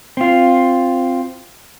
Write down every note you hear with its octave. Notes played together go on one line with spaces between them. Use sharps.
C4 F4